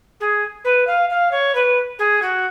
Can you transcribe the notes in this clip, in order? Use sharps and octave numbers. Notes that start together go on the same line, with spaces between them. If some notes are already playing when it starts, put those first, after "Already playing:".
G#4
B4
F5
F5
C#5
B4
G#4
F#4